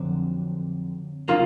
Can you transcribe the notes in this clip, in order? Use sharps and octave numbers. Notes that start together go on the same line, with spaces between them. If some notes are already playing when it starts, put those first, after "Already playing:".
Already playing: F2 D3 F#3 C4
C#3 F#3 A#3 F4